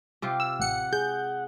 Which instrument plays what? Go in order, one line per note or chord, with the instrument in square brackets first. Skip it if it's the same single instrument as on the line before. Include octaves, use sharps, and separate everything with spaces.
[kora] C3 F4 G4
[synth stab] E6
[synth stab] A1 C#7 [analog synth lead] F#5
[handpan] G#4 [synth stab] G6